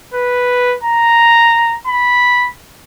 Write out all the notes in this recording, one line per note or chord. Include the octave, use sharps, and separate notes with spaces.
B4
A#5
B5